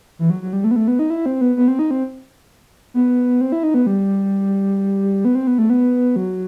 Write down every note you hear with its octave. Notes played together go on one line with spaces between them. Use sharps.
E3
F#3
F#3
G3
A3
B3
A3
B3
D#4
E4
C4
B3
B3
C4
D#4
C4
B3
C4
E4
D#4
B3
G3
B3
C4
B3
A3
B3
F#3